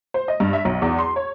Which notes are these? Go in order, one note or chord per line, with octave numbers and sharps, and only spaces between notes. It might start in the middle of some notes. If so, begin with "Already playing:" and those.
C5
D#5
G2
E5
B1
E2
C6
C#5